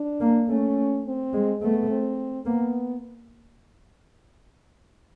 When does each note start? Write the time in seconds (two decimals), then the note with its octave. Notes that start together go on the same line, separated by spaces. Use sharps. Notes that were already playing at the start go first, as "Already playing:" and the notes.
Already playing: D4
0.21 A#3
0.49 A3 C#4
1.05 C4
1.33 G#3
1.62 A3 B3
1.90 C4
2.46 A#3 B3